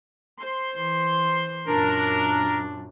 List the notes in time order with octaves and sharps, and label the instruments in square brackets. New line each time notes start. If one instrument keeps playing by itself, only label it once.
[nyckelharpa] C5 C6
[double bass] E3
[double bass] F#2 A#2 [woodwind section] D4 [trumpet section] A#4